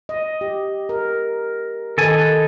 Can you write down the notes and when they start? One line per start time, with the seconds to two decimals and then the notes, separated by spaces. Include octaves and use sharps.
0.09 D#5
0.41 G4
0.89 A#4
1.98 D#3 A4 B4 D#5 G#5